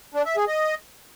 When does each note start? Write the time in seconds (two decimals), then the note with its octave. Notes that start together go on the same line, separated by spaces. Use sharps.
0.14 D4
0.26 E5
0.37 G#4
0.48 D#5